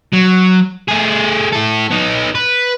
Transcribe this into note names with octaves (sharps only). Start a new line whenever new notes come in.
F#3
A3 G#4
E4 A4
B3 D#4
B4